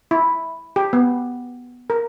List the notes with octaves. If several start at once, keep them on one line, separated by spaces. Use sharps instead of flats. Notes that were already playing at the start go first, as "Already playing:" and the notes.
E4
G4
B3
A#4